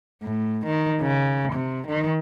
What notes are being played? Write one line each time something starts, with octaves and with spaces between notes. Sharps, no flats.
A2
D#3
C#3
C3
D#3